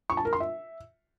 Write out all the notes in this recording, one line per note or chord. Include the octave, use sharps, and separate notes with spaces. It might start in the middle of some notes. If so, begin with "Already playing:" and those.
C#6
A5
A#4
C6
E5